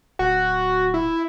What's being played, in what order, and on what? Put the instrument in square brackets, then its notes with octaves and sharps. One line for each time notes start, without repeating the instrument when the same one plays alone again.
[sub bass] D1 [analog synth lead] F#4
[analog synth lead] E4